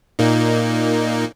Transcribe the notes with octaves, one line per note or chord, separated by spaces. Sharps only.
A#2 A#3 D#4